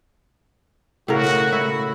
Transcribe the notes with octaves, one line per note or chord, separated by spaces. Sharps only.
A2 C#3 F#4 A#4
E4